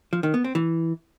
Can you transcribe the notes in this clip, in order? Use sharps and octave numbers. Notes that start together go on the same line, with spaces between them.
F3
D#3
B3
C4
E3